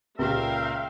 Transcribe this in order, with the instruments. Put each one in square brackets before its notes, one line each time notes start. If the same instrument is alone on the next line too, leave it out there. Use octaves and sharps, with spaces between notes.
[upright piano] C#2 A#2 C#3 [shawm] A#4 [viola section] E5 F5 G5